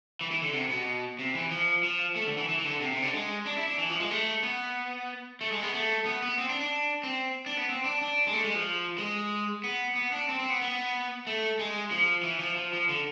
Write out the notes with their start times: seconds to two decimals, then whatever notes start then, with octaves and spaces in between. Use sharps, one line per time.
0.21 E3
0.31 E3
0.43 D3
0.53 C3
0.70 B2
1.19 C3
1.35 E3
1.51 F3
1.83 F3
2.16 A3
2.27 D3
2.38 E3
2.49 E3
2.59 E3
2.65 D3
2.81 C3
2.92 C3
3.02 D3
3.13 G#3
3.46 D4
3.57 E4
3.68 D4
3.79 E3
3.90 F3
4.00 G#3
4.11 A3
4.43 B3
5.41 A3
5.52 G#3
5.63 B3
5.74 A3
6.06 B3
6.22 B3
6.38 C4
6.49 D4
6.60 D4
7.03 C4
7.46 D4
7.57 B3
7.69 C4
7.85 D4
8.01 D4
8.27 G#3
8.33 A3
8.44 G#3
8.55 F3
8.98 G#3
9.64 B3
9.96 B3
10.12 D4
10.29 C4
10.39 C4
10.50 B3
10.62 B3
11.27 A3
11.59 G#3
11.91 F3
12.23 E3
12.40 F3
12.56 F3
12.73 F3
12.89 D3